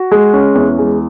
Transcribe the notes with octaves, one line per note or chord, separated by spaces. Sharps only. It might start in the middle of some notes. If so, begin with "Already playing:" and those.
Already playing: F#4
G#3
C#4
E2
G#3